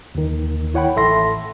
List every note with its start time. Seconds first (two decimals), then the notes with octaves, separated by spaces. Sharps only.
0.15 D#2 D#3
0.74 E4 C#5 F#5 G5 B5
0.96 A1 A4 E5 C6 A#6